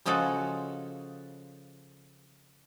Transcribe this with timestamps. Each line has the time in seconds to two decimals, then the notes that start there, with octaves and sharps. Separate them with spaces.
0.06 C#3 F3 G#3 F#4 A4